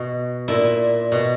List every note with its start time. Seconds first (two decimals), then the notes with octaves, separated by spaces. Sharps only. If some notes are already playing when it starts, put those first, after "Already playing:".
Already playing: B2
0.48 A#2 E4
1.12 B2